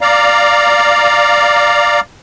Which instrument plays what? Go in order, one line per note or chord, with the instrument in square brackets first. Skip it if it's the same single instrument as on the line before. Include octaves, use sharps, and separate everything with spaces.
[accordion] D5 F5 A#5